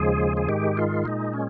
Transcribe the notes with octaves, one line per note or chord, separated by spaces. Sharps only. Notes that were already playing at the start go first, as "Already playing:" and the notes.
Already playing: D#2 C#3 F3 G#3 G#4
G#4
G#2 D#3 G#3 G4
F4
A#2 G#3 D#4
C#4